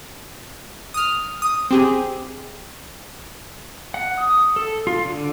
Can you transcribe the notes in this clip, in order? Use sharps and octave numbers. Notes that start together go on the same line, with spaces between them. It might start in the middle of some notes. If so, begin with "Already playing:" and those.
D#6 F6
D#6
C4 G4 G#4
F#5
D#6
A4
F4
D3